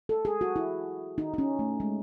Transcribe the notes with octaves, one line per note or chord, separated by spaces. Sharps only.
A4
G#4
F#4
E4
D#4
D#4
C#4
A3
G#3